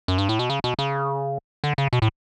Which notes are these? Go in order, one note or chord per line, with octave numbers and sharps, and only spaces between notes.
F#2
G2
A2
B2
C#3
B2
C#3
D3
C#3
B2
A2